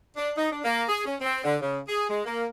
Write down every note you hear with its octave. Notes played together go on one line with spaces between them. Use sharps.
D4
D#4
D4
A#3
G#4
C#4
C4
D3
C#3
G#4
G#3
A#3